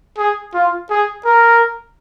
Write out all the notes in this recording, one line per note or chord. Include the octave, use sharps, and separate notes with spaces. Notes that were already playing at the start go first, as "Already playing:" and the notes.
G#4
F4
G#4
A#4